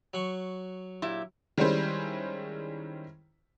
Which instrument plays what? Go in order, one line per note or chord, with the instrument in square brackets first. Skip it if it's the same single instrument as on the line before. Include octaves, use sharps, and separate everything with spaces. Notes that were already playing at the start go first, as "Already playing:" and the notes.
[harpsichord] F#3 F#5 C#6
[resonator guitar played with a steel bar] A#2 E4 G4
[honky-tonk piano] D#3 G3 G#3 C#4 E4 C5